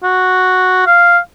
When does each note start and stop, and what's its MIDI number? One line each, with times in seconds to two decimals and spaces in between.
0.03 0.82 66
0.86 1.18 77